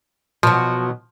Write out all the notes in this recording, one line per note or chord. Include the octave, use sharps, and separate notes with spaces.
B2 F3 F#3